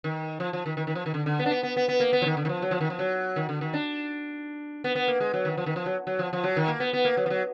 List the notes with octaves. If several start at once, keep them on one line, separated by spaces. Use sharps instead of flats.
D#3
F3
F3
D#3
D#3
D#3
F3
D#3
D3
D3
B3
D4
B3
B3
B3
B3
A#3
B3
F3
D#3
D3
D#3
F3
F#3
F3
D#3
F3
F#3
D#3
D3
D#3
D4
B3
B3
A#3
G#3
F#3
D#3
F3
D#3
F3
F#3
F#3
F3
F3
F#3
D#3
A#3
B3
B3
A#3
F#3
F3
F#3